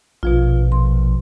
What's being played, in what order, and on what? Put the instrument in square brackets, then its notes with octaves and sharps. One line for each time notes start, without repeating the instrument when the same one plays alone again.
[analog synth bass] A#1 [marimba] B2 F3 F4
[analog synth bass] A#1 [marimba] C6